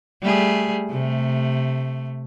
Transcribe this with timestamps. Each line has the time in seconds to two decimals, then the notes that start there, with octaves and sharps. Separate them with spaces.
0.22 G3 A3 G#4
0.90 C3 A3